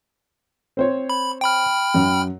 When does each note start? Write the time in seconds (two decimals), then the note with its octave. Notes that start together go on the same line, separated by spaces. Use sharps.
0.77 C4 C5 C#5
1.10 B5
1.41 G5 B5 F6
1.94 F#2